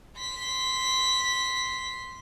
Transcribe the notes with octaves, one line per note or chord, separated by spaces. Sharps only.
C6 B6